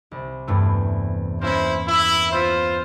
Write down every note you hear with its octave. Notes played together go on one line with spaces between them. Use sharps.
C2
E2 G2 A3
A#3 C#4 E4 C5 C#5
E4
B3 F4 C5 E6 B6